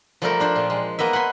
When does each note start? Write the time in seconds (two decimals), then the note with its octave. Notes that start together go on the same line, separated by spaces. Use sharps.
0.22 F3 G3 A3 G4 A#4 C5
0.40 D4 F4 C5
0.56 A#2
0.70 G#3
0.99 A#3 B3 D#5 E5
1.13 F#5 G#5 B5 C6